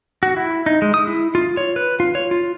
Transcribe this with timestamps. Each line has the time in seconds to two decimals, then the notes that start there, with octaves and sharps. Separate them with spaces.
0.23 F#4
0.37 E4
0.66 D#4
0.82 G#3
0.94 D#6
1.07 E4
1.35 F4
1.57 C#5
1.76 B4
2.00 F4
2.15 C#5
2.31 F4